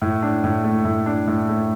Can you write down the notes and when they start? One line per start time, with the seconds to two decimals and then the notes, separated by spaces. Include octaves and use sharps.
0.02 A2
0.23 D4
0.44 A2
0.64 A3
0.85 A2
1.06 D4
1.27 A2
1.49 A3